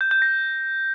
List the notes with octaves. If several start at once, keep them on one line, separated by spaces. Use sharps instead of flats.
G6
G6
A#6